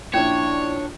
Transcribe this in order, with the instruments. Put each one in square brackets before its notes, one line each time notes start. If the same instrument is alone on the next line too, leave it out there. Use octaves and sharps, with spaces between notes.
[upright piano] A#1 E4 E7 [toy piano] C#4 D5 [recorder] D4 [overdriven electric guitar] C#5